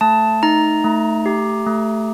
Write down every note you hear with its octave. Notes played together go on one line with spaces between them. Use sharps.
A3 A5
D#4 A#5
A3
G4
A3